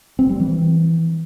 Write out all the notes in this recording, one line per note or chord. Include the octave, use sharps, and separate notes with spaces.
C4
G3
E3